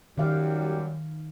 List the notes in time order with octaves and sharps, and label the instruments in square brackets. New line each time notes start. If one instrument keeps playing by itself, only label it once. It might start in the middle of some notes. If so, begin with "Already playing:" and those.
[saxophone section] F#2 F#3 G3 [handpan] D#3 F5